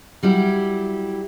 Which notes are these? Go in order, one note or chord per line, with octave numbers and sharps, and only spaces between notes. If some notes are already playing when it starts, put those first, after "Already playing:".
F#3 G3 E4 G4